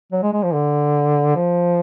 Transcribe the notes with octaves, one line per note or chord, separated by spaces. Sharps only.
F#3
G#3
G#3
F3
D3
F3